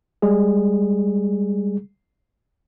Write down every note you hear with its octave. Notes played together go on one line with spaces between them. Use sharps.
G3 G#3 G#4